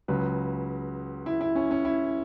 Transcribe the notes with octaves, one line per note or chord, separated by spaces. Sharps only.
C#2 C#3 F#3 B4
E4
E4
C#4
C#4
E4